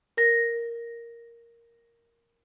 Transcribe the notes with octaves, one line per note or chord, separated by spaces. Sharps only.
A#4 A#6